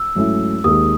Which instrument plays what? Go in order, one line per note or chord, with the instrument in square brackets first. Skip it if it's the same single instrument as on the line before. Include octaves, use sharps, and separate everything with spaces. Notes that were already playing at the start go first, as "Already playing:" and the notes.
Already playing: [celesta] E6
[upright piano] G#2 F#3 A3 C#4 E4
[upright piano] D#2 D#3 G#3 [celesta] D#6